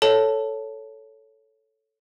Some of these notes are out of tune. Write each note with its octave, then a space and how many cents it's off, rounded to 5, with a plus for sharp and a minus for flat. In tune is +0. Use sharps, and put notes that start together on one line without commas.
A4 +0 C#5 +0 A5 +0